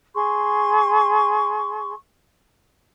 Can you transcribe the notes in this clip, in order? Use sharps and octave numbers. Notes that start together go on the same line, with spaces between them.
G#4 C6 C#6